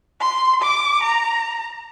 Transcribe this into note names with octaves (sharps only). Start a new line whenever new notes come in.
C6
D6
A#5